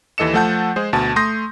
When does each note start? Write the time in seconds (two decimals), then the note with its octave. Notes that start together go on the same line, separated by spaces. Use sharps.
0.18 D#2 E3 A4 D#5 C#7 E7
0.33 F3 A3 A4 F#5 A5 G6
0.76 G#3 G#4 C5
0.93 D2 B2 A5
1.16 A3 C6 D#6 G6 A#6